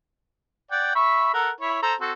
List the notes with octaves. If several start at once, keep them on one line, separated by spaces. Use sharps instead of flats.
D5 F#5 G5
E5 B5 C#6
A4 A#4 F#5
E4 C#5 B5
A4 C5 A#5
C4 F#4 A4